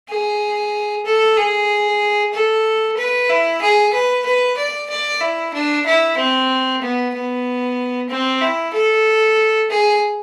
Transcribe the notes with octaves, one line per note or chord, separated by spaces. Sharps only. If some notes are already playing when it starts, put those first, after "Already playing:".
G#4
A4
G#4
A4
B4
E4
G#4
B4
B4
D5
D5
E4
D4
E4
C4
B3
B3
C4
E4
A4
G#4